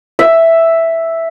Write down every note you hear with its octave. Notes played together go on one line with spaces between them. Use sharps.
E5